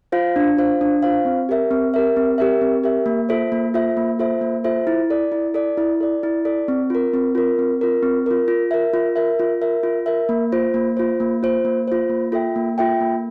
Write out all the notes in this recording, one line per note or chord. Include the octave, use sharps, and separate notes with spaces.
F4 C5 F5
D4
F4 C5 F5
D4
F4 C5 F5
C4
G4 A#4 E5
C4
G4 A#4 E5
C4
G4 A#4 E5
C4
G4 A#4 E5
A#3
F4 A4 C5 E5
A#3
F4 A4 C5 E5
A#3
F4 A4 C5 E5
A#3
F4 A4 C5 E5
E4
A4 D5
E4
A4 D5
E4
A4 D5
E4
A4 D5
C4
F4 A#4
C4
F4 A#4
C4
F4 A#4
C4
F4 A#4
F4
A#4 E5
F4
A#4 E5
F4
A#4 E5
F4
A#4 E5
A#3
F4 C5
A#3
F4 C5
A#3
F4 C5
A#3
F4 C5
A#3
F4 A4 E5 G5
A#3
F4 A4 E5 G5
A#3